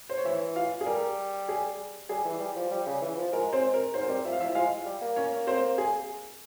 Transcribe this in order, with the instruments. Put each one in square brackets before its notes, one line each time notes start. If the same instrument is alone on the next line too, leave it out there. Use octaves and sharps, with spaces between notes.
[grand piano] C5
C#5
[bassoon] E3 [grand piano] E4 E5
[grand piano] F4 F5
G#4
[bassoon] G3 [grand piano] A#4
[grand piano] G#4
[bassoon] G3 [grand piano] G#4
[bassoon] E3
G3
F3
G3
C#3
E3
F3
[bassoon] G#3 [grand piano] A#4
[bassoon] G#3 [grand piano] C4 C5
[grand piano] A#4
[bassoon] G#2 [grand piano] C5
[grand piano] A#4
[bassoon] G3 [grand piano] C4 C5
[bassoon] F3 [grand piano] E5
[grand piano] F5
[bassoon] F3 [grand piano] E4 E5
[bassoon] G#3 [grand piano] F4 F5
[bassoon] G3
A#3
[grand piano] C#4 C#5
C4 C5
G#4